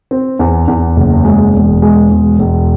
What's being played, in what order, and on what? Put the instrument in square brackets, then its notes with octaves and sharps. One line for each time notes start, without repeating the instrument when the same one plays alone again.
[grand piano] C4
E2
E2
F#1
G#3
E1
G#3
E1
E1